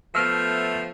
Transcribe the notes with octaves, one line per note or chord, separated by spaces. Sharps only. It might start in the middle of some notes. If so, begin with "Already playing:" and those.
F3 A3 B3 E6 F6